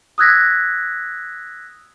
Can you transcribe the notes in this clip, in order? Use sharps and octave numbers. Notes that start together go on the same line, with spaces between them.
D#6 E6 F#6 G#6 A#6 B6